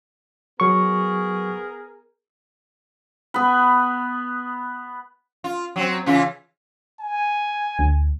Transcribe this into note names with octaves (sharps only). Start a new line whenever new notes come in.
F#3 B3 G#4 A#4 C#6
B3 B4
F4
F#3 C4
C#3 E3 F4
G#5
D2